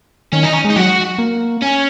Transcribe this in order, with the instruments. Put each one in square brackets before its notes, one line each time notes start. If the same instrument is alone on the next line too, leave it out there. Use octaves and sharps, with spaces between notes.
[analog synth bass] D#3 [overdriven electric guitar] C#4
[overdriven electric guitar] D#4
C#4
[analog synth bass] G#3
[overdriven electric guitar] D#4
[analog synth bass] F#3 [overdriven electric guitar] F#4
[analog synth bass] A#3
[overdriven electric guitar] C#4